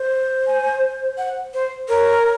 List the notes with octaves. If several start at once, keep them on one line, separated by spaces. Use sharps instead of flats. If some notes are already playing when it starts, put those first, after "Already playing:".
Already playing: C5
G#5
F#5
C5
A#4 C#5